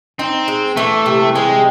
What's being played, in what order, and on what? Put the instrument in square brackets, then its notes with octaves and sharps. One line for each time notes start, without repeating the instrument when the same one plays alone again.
[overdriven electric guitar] C4 [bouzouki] D#4
[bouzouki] G#3
[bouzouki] E3 [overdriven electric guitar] A3
[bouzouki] C3
[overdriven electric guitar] G#3 [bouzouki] C4